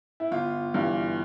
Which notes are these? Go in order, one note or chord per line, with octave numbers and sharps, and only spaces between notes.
E4
G1 F4
G2 E3